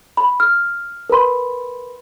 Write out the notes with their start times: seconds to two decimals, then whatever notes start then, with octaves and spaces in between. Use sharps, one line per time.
0.17 B5
0.40 F6
1.10 A#4 B4 B5 C6